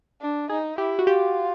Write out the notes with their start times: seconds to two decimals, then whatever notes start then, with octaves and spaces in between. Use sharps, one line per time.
0.21 D4
0.49 D#4 G#4
0.78 E4 G4
0.99 F#4
1.07 F4 G4